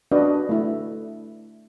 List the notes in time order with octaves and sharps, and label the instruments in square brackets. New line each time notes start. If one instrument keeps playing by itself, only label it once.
[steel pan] D4 F#4 B4 D5 D#5
A3 E4